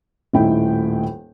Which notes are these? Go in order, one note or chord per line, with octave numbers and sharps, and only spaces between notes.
D#1 A2 D#4 E4 G5